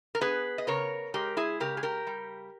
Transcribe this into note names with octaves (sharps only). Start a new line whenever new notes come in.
A#4
B3 G#4 B4
D#5
C#3 A#4 C#5
G#3 G4 A#4
E4 G#4
C#3 G4 A#4
G#4
G4 A#4
G3